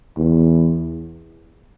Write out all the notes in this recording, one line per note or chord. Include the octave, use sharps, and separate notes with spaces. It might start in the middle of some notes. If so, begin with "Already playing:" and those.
E2